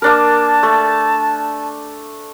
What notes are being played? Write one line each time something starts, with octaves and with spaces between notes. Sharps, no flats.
A#3 D4 A#4 A5
A3